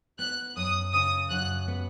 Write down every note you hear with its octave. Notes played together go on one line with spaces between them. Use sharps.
B3 F#6
F#2 D#6
C#3 D#6
F#2 F#6
B3